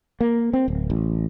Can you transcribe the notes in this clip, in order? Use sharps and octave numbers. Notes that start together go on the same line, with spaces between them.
A#3
C4
D1
A1